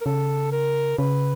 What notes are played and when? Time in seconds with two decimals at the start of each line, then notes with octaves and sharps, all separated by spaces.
0.01 A#4
0.05 C#3 A4
0.52 A#4
0.98 C#3 B4